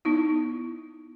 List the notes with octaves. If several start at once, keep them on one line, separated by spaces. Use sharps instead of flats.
B3 D#4 E4